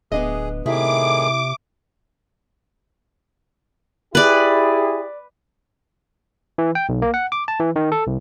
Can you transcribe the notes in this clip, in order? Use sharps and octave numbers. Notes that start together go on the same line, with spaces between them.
D1 B3 D4 G#4 D#5
A2 C3 D#3 E4 G#4 D6
E4 G4 G#4 B4 D5
E3
G5
B1
A#3
F#5
D6
A5
E3
D#3
A4
C2